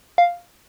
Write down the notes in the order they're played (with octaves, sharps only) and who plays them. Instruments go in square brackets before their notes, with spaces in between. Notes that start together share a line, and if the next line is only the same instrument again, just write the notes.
[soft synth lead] F5